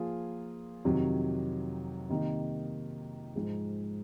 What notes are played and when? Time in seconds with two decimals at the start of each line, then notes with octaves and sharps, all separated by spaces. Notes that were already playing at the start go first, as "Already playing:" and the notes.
Already playing: F3 A#3 F4 G#4
0.85 F2 C3 D#3 F#3
2.09 C3 D#3 A#3 D#4
3.36 G#2 F3 G#3